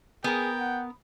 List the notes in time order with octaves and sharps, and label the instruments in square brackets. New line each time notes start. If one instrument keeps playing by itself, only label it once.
[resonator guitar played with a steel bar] B3 A#4 [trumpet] G#4 [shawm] G5
[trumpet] F#5